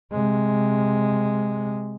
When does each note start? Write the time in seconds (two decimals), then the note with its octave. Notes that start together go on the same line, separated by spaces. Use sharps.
0.12 C3 G#3